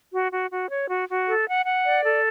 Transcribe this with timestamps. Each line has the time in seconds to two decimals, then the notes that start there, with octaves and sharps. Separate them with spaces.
0.12 F#4
0.32 F#4
0.51 F#4
0.70 C#5
0.89 F#4
1.08 F#4
1.27 A4
1.47 F#5
1.66 F#5
1.85 D5
2.04 A4